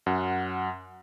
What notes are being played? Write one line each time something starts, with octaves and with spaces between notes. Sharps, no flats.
F#2 F#5